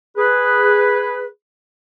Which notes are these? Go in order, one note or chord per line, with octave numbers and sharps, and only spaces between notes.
G#4 B4